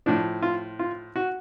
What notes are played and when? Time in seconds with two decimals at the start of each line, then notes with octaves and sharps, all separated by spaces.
0.06 A2 F3 D4
0.42 F4
0.79 F4
1.16 F#4